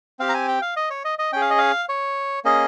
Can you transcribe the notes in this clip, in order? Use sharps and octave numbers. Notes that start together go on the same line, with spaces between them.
C4 G4 F5
A#5
G#5
G5
F5
D#5
C#5
D#5
D#5
C#4 G#4 G5
F5
D#5
F5
C#5
A#3 C#4 G#4 D#5